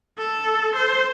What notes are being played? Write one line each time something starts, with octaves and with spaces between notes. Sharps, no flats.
A4
C5